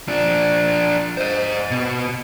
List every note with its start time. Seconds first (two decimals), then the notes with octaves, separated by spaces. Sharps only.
0.08 F3 D4
1.17 C5 D#5
1.71 B2